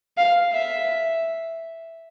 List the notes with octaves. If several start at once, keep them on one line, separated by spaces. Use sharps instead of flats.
F5
E5